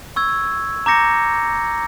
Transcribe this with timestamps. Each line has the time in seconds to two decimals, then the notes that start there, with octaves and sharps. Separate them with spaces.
0.16 C#6 E6 G#6
0.86 A#5 D6 G6 A#6 C#7